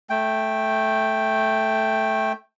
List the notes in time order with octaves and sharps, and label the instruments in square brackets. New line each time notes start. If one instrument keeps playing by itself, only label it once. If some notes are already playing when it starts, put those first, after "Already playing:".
[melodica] A3 G5